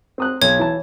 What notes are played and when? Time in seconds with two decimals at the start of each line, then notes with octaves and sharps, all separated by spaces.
0.18 C4 D#6 F#6
0.42 B1 C#5 G#6
0.59 E3 A5